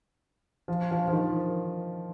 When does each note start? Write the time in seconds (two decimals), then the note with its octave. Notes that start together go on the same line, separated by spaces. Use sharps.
0.68 F3
0.91 F3
1.08 F3
1.13 D#3